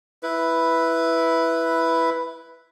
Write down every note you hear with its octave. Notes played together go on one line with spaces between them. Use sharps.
E4 B4